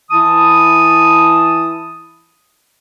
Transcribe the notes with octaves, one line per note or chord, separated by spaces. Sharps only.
E3 E4 A5 D#6